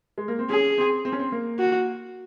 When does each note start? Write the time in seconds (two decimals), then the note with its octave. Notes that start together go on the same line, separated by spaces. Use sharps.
0.18 G#3
0.28 A#3
0.39 C4
0.50 C#4 G#4
0.78 C4
1.05 C4
1.12 C#4
1.19 C4
1.32 A#3
1.59 F#4